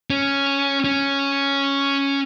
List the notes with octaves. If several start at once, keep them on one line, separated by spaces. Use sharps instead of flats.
C#4
C#4